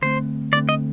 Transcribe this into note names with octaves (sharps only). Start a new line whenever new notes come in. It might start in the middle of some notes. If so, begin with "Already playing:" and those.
D3 A3 C4 C5
D3 A3 C4 D5
D#5